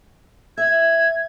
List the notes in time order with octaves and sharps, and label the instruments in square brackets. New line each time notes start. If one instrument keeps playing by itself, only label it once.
[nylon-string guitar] E5 [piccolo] G#6